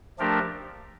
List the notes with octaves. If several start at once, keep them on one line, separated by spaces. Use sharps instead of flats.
F3 A3 D4 G4 A#4